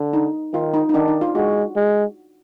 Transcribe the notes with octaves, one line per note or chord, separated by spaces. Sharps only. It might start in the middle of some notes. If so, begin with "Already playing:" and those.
Already playing: D3
D#4
D#3 F4
D#4
D#4
D#3 D4
D#4
F4
G#3 F#4
G#3